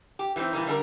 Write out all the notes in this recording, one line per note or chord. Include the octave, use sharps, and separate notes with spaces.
G4
E3 G3 B3 C4 D#4
A#2 E3 G3 D#4
D3 G3 D4 G#4 A#4